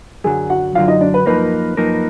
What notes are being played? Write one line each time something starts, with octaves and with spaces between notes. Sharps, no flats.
F#2 D3 F#3 G#4 G#5
F#4 F#5
F#2 D3 F#3 F4 F5
D#4 D#5
D4 D5
B4
F#2 F3 A#3 D#4 A#4 B4
F#2 F3 A#3 D#4 A#4